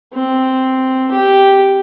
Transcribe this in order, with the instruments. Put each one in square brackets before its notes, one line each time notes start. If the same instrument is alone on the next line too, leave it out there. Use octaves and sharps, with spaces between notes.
[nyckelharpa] C4
G4